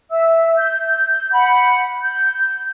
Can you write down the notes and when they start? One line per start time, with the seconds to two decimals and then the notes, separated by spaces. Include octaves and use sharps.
0.11 E5 E6
0.57 G6
1.32 F#5 B5
2.01 G6